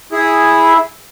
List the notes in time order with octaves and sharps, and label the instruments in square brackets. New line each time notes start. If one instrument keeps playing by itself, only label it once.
[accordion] E4 G#4